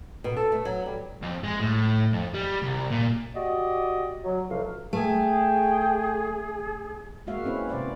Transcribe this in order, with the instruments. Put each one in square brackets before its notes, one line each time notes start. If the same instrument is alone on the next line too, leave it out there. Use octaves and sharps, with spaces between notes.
[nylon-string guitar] B2
A4
A3
F#3
G3
[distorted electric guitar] F2
G#3
A2
F2
G3
C2
A#2
[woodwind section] F#4 G4 D5 D#5
F#3
C#2 A2 C3 F3 F#4 F5
[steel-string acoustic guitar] A3 [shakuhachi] G#4 [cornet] G5
[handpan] G#3 A#3 F#4 E5 F5
C4 C#4 E4 B4
C3 B3 C5 D5 F5